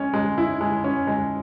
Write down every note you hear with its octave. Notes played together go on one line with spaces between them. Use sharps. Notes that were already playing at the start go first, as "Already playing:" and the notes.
Already playing: G#3 C#4
G#3
E4
G#3
C#4
G#3